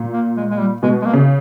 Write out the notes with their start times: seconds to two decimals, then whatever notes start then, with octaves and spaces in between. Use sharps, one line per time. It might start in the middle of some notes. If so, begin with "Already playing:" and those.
Already playing: A#2
0.14 A#3
0.37 G#3
0.50 G#3
0.59 G3
0.83 B2 G#3
1.02 G#3
1.05 A#3
1.13 C#3